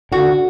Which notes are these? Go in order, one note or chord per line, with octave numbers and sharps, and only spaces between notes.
D3 F#4